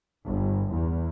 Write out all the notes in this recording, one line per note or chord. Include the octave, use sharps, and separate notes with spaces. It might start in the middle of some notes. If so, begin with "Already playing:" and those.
G1
E2